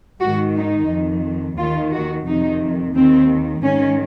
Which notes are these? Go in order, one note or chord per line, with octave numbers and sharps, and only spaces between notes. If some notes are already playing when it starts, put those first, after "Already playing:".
G#2 D#3 F#4
D#4
F2 D#3
D#2 D#3 F4
F#4
F2 C3 D#3 D#4
D#2 D#3 C4
G#2 D#3 C#4